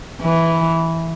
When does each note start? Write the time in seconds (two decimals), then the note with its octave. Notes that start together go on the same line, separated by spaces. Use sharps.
0.21 E3